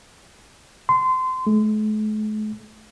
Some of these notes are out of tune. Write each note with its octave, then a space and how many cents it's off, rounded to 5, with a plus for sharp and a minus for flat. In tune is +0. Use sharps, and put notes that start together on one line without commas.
C6 -25
A3 -45